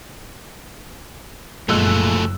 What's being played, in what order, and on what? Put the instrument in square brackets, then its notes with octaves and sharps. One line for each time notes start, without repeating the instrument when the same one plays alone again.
[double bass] F#1 F#2 [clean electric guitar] A#2 [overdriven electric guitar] F3 A3 [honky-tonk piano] G#3 E6 F#6